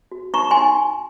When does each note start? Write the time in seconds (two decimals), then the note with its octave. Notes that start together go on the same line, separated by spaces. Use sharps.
0.12 F#4
0.34 D#4 A#5 C#6
0.51 G#5 C6
0.57 D#4